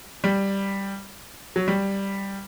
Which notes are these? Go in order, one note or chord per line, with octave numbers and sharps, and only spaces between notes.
G3
F#3
G3